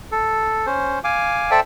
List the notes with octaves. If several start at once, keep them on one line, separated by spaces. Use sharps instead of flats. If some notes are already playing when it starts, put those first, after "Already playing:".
A4
C#4 C5
F5 G#5 D6
A4 C5 D5 E5 G5 A5